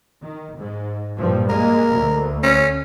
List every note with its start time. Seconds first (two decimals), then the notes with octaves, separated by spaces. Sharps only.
0.22 D#3
0.59 G#2
1.17 G2 A#2 F3
1.49 G#3 A#3 A#4
1.92 D2
2.43 C#4